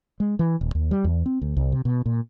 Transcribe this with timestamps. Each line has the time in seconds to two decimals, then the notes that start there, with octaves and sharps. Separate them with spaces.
0.20 G#3
0.39 E3
0.61 D#1
0.75 D#2
0.91 G3
1.04 E2
1.26 C4
1.42 D2
1.57 C2
1.72 C3
1.85 B2
2.06 A#2